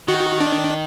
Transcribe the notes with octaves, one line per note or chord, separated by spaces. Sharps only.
D#3 F#4
D4